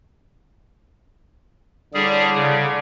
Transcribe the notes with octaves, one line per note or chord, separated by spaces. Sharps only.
A2 D3 G3 D4 G#4
C#3